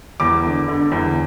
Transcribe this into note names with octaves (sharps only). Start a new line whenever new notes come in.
E2 D6
D3
D3
E2